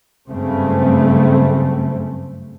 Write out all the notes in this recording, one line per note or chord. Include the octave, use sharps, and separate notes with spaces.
F#1 G2 C#3 A3 C4